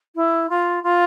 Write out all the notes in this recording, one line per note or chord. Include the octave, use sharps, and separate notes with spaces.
E4
F4
F4